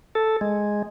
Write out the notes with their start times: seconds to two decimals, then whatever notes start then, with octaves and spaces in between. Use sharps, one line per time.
0.15 A4
0.41 G#3